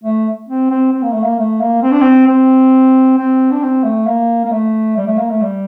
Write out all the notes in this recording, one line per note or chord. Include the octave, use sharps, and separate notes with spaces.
A3
C4
C4
C4
A#3
A3
A#3
A3
A#3
C4
D4
C4
C4
C4
D4
C4
A3
A#3
A#3
A3
G3
A3
A#3
A3
G3